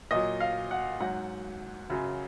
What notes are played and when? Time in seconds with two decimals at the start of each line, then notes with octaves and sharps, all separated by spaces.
0.11 A#2 F#3 D#5
0.40 F5
0.71 F#5
1.00 G#2 F#3 F#5
1.90 F#2 C#3 F#3